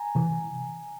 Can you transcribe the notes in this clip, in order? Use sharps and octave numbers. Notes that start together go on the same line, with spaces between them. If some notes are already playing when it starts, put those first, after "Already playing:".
Already playing: G#5 A#5
C3 E3